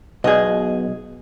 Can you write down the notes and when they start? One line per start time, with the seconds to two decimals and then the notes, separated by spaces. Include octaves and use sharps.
0.24 B1 B2 G#4 D#5